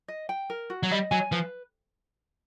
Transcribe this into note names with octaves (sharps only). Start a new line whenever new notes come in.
D#5
G5
A#4
F#4
F#3
G3 D#5
F#3 G#5
F3 B4